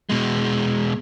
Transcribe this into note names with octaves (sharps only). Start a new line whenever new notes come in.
B2 G#3